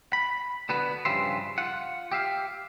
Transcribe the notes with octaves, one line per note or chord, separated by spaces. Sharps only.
B5
D3 B3 F#4 B4
G2 C#3 F3 G4 E5 C6
F4 F#5
G4 E5 F5